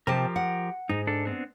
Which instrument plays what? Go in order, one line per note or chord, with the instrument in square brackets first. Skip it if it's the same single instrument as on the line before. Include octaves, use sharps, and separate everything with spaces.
[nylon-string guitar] C3 A5 [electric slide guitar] F3 G4 A#4
[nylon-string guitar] F#5
[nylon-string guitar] G#2 [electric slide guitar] D#4
[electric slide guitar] D4 A4
B3 C4 D4